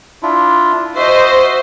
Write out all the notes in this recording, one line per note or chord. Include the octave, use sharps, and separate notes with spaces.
D4 E4 F4
F#4 C5 D#5 E5